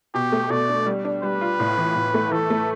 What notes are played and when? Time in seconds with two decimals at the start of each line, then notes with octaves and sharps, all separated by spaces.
0.14 B2 G4
0.32 A3
0.50 B2 D5
0.69 D4
0.86 G3
1.05 D4
1.23 G3 B4
1.41 F4
1.60 A2
1.78 E3
1.96 A2
2.14 A3
2.31 E3 A4
2.50 A3